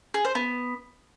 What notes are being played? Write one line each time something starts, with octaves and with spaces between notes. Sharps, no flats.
G#4
C5
B3